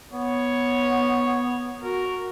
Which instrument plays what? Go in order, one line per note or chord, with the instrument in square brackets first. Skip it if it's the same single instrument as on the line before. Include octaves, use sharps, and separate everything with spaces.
[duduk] B3 [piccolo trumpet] C#5
[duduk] F#4 [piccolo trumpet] A#4